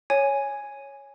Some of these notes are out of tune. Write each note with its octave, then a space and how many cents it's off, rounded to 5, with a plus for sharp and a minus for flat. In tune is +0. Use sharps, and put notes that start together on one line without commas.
C#5 +0 G#5 +0